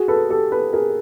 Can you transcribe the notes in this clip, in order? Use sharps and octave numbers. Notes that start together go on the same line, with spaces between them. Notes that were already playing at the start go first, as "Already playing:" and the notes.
Already playing: F#4 G#4
A4 B4
G4 A4
A4 B4
G#4 A#4